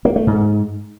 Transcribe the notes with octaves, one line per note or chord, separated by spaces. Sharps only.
A#3
A3
G#2